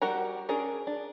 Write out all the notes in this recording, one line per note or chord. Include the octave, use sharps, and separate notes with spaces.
G3 F#4 A#4 F#5 A#5
C#4 D4 G#4 A#4
D4